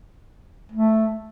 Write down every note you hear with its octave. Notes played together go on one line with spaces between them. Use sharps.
A3